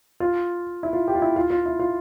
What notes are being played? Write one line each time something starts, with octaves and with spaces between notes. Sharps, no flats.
F4
E4
F4
G4
F4
E4
F4
F4
E4
F4